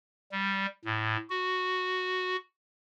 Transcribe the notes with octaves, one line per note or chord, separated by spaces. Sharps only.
G3
A2
F#4